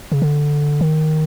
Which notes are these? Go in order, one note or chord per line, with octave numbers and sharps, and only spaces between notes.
C#3
D3
D#3